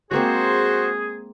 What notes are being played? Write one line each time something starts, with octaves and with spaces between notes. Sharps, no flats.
G#3 A#3 C4 F#4 G#4 C5